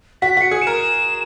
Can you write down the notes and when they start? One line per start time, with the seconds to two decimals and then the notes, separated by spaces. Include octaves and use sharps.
0.22 F#4 B6
0.37 F#4
0.41 C#7
0.51 G#4
0.62 E7
0.67 A#4